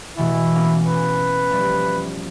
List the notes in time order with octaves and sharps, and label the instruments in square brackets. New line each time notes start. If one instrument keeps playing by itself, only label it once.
[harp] B2 E3 A3 [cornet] E4
[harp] A#3 B3 C#4
[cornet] B4
[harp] F3 G3 A3